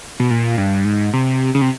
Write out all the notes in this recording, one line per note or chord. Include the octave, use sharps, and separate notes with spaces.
B2
A#2
G2
G#2
C3
C#3
C3